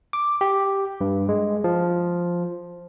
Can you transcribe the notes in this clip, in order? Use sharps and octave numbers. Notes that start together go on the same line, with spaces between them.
D6
G4
G2
G#3
F3